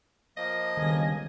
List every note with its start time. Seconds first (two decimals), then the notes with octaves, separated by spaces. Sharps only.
0.37 F3 A#3 D#5
0.77 G1 C#2 D#3 G#5